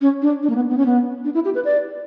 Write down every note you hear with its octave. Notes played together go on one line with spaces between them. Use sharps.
C#4
D4
D4
A#3
B3
B3
C#4
B3
D4
E4
G4
B4
D5